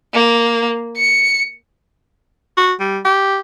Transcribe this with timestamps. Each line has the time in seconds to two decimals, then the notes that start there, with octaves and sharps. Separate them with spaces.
0.13 A#3
0.97 C#7
2.57 F#4
2.80 G3
3.05 G4